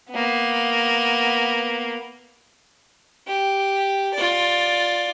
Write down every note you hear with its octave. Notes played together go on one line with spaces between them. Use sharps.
A#3 B3
G4
F4 D5